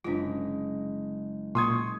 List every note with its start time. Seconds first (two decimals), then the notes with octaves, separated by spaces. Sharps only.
0.04 F#1 G#3 D4 F4
1.55 A#2 C6 C#6 D#6 G#6